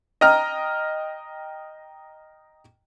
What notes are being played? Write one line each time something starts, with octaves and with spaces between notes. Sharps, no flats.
D#5 G5 A#5 F6